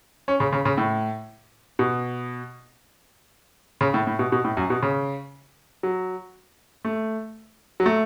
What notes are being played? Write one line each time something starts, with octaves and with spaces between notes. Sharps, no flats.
C#4
C#3
C#3
C#3
A2
B2
C#3
A2
A2
B2
B2
A2
F#2
B2
C#3
F#3
A3
F#3
A3